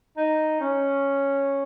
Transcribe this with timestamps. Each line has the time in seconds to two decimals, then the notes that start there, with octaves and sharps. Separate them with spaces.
0.17 D#4
0.60 C#4